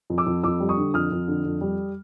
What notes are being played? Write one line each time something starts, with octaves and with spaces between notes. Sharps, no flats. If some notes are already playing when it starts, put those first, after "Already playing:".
F2
D6 E6
F2
F2 D6 E6
G3
C#6 D#6
D3
F2 D#6 F6
F2
D3
F2
G3